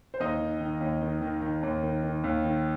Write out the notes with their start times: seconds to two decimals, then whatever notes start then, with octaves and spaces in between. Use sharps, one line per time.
0.14 C5
0.20 D#2 D#4 D#5
0.40 D#3
0.60 D#3
0.81 D#2
1.02 D#3
1.21 D#3
1.42 D#3
1.63 D#2
1.83 D#3
2.04 D#3
2.24 D#2
2.44 D#3